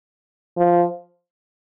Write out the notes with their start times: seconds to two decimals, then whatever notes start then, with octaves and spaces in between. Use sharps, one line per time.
0.58 F3